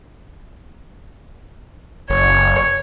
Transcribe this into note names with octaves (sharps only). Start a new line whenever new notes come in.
F#1 C#5